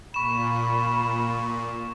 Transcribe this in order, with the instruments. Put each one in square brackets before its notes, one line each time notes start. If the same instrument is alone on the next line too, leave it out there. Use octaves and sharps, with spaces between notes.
[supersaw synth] A#2 [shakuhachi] B5 [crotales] C#6 E7